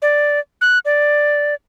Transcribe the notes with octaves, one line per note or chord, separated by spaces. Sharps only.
D5
F#6
D5